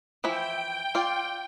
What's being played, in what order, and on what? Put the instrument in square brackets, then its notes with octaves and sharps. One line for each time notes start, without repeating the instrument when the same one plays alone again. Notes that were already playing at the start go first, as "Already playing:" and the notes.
[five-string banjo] E3 F3 E4 [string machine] G5
[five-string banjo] F4 D5